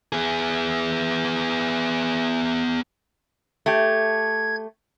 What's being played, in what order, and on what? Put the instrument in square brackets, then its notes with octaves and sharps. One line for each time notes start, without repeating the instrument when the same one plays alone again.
[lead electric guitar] B3 G#4
[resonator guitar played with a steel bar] A3 G4 [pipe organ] G#6